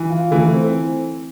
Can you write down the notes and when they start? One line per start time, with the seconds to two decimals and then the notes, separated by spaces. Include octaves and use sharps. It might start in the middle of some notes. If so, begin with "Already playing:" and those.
Already playing: E3
0.10 F4
0.31 E3 A3
0.53 C4